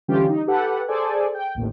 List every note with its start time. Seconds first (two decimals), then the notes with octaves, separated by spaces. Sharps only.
0.08 D3 E3 G3 C#4 F4 G4
0.29 D#4
0.47 G4 A4 B4 F#5
0.88 G#4 A4 C5 D5 G#5
1.35 G5
1.55 A1 D#2 A2